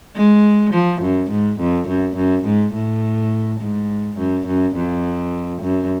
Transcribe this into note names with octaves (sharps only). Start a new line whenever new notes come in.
G#3
F3
F#2
G#2
F2
F#2
F#2
G#2
A2
G#2
F#2
F#2
F2
F#2